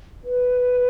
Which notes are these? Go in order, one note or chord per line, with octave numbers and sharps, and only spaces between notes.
B4